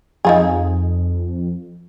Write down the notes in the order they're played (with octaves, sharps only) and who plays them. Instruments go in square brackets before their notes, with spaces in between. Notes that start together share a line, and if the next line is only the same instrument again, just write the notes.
[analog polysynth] F2 [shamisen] D#4 F4 G#4